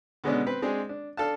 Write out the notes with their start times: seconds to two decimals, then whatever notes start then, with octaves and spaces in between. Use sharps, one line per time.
0.24 B2 D3 G#3 B3 C#4 D4
0.46 C4 B4
0.62 G#3 C4 D4 G#4
0.89 D4
1.17 D4 A4 F5 A5